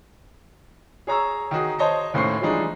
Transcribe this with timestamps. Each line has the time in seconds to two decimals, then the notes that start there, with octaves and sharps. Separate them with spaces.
1.07 G#4 C#5 A#5 C#6 E6
1.51 D#3 D#4 F#4 G#4
1.79 C5 C#5 D#5 A5
2.14 D#2 A2 C#4 C5 C#6 C7
2.41 E3 F3 G3 G#3 D4 D#4